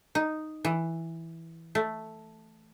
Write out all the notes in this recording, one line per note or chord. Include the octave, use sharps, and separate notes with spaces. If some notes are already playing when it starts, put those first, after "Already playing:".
D#4
E3
A3